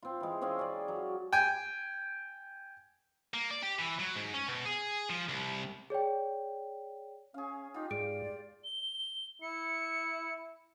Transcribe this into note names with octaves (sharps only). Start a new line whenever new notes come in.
C4 F4
E3 G#3
C4 C#4 G#4 F5
C#4 D5
F#3
G5 G#5
A#3
D5
G4
E3
F#3
G#2
C#4
B2
G#4
F3
C2
G#4 C#5 D5 G5
C#4 G#4 F5
D#4 F4 G4
G#2 G#4 D5 D7
G7
E4 C#7